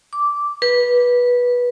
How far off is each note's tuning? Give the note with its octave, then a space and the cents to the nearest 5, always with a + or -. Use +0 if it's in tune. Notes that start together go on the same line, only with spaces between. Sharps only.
D6 -10
B4 -15